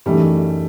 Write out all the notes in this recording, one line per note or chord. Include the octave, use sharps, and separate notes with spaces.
F#2 E3 G3 A3 D#4